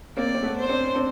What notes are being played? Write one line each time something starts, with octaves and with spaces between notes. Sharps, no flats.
A#3 C4 D5
C4
A3 B3
C5
C4 D4
C#4
C4 D4